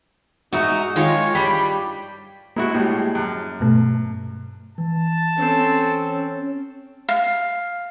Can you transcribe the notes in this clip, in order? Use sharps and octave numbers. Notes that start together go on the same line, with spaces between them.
G#2 D#4 F#4 E5 A#5
D#3 G#3 F4 C#5
G2 G3 G5 B5
G#3 A#3 E4 F#4
A2 G3 G#3
F#2
G2 B2 A3
E3 A5
C4 C#4 A4
F5